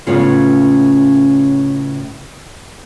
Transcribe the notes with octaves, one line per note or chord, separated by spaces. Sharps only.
A2 C#3 B3 C#4 F4